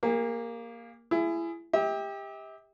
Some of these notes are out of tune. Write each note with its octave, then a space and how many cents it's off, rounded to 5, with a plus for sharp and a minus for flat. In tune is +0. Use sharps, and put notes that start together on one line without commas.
A#3 +0 G#4 -45
E4 +25 G#4 +0
G4 +20 E5 -40